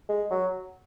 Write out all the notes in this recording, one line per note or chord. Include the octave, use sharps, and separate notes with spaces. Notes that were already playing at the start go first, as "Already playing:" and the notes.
G#3
F#3